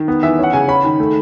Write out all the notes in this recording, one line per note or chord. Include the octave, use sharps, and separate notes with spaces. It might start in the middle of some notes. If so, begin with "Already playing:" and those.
Already playing: D#3
B3
E3 E5
C#4 F#5
C#3 G#5
C#4 B5
D#3
A3